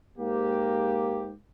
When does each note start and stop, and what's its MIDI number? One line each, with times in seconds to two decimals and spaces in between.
0.18 1.32 44
0.18 1.32 58
0.18 1.32 67